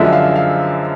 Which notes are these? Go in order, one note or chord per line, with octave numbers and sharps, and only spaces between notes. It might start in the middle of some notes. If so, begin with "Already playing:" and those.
Already playing: F#2 D3 F3 G#3 E5
F5
F5